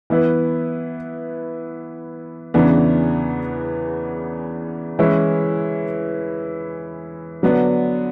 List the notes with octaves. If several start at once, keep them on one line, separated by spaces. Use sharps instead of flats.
E3 B3 E4 B4
E2 C#3 E3 B3 D4
E3 G#3 C#4 E4
D3 F#3 B3 D4